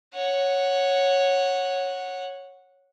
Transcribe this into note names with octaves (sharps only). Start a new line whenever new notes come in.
C#5 F#5